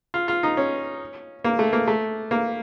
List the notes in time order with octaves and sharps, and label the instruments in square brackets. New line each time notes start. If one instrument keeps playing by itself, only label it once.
[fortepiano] F4
F4
D#4
C#4
A#3
A3
A#3
A3
A#3